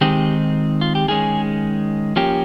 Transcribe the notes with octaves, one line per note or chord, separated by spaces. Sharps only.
D#3 G#3 C4 D#4 G4
F4
G4
D#3 G#3 C#4 G#4
F3 A#3 C#4 G4